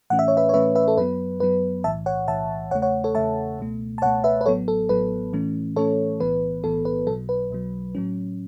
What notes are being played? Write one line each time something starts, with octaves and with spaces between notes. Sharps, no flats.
A2 E3 A3 C#4 F#5
E5
C#5
B4 E5
C#5
A2 E3 A3 C#4 B4 E5
B4 E5
A4
F#2 F#3 B3 B4
F#2 F#3 B3 B4
B1 A2 E3 E5 A5
C#5 F#5
B1 A2 E3 E5 A5
E2 C#3 A3 C#5 F#5
C#5 F#5
A4 C#5
E2 C#3 A3 E5 A5
C#2 B2 A3
A5
C#2 B2 A3 C#5 F#5
B4 E5
B4
A1 A2 F#3 B3 A4 C#5
A4
A1 A2 F#3 B3 B4
A2 E3 A3 C#4
A2 E3 A3 C#4 A4 C#5
B1 A2 E3 B3 B4
B1 A2 E3 B3 A4
B4
B1 B2 F#3 A4
B4
B1 B2 F#3
A2 F#3 C#4